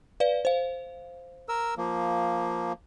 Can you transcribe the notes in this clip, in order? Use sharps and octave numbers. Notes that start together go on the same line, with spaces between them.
B4 D5 F5
C5 F5
A#4 E6
F3 A#3